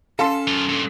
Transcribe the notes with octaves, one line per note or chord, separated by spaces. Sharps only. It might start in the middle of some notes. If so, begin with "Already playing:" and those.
C#4 A4 F5 A5 C6
F#2 F4
G2 A#2